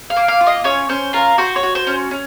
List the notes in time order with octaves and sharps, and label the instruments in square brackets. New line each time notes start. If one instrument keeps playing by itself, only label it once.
[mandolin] F5
A#3
F5
F4
D#5
C#4 C#5
C#4 C5
F4 A#4
F#4 C5
C#5
F#4
C5
C#4
C#4